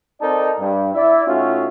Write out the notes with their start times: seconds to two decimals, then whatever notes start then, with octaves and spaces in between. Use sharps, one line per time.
0.21 C4 D#4 A4 A#4 D5 A5
0.58 G2
0.95 E4 D5 E5
1.27 A2 C#4 D#4 F4 F#4 E5